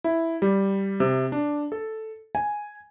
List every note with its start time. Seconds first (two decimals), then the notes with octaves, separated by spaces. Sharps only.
0.04 E4
0.42 G3
1.00 C3
1.32 D4
1.72 A4
2.35 G#5